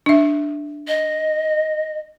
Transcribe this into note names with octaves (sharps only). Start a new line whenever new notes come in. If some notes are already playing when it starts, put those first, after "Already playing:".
D4 E5
D#5